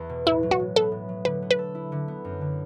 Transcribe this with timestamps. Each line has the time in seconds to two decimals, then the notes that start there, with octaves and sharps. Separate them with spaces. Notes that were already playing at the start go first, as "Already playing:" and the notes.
Already playing: E2 B3
0.09 B2
0.26 A2 E4
0.43 F#3
0.51 F#4
0.60 A2
0.76 B3 A4
0.92 A2
1.09 F#3
1.25 D3 B4
1.42 B3
1.51 B4
1.59 A4
1.75 E4
1.92 D3
2.08 B3
2.25 F#2
2.41 D3